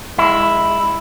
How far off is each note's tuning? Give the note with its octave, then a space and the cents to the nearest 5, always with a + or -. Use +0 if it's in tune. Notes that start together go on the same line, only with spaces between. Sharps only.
G#3 -20 E4 +0